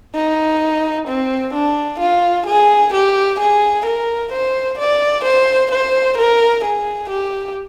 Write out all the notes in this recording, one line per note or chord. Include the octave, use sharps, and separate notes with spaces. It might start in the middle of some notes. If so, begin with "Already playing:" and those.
D#4
C4
D4
F4
G#4
G4
G#4
A#4
C5
D5
C5
C5
A#4
G#4
G4